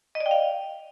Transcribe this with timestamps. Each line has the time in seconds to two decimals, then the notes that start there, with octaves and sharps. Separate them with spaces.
0.15 D#5
0.20 D5
0.26 G5
0.31 F5